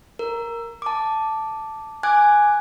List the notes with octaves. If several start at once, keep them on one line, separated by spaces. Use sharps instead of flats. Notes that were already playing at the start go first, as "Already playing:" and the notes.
A#4
A5 D6
G#5 D6 F#6 G#6